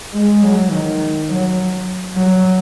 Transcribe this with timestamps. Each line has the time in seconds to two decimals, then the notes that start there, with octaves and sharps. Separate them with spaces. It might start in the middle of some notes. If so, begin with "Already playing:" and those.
0.13 G#3
0.42 F#3
0.71 D#3
1.29 F#3
2.15 F#3